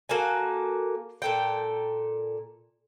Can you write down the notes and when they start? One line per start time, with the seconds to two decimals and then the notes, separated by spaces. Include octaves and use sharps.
0.09 A#3 F#4 A4 G#5
1.22 A#2 A4 G5